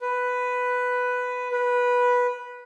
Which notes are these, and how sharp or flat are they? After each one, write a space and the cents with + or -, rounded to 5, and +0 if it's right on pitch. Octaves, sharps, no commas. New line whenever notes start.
B4 +5
B4 -10